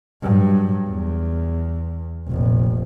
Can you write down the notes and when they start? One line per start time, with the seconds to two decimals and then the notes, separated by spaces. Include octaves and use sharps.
0.22 G2 F#3
0.88 E2
2.28 F1 A#1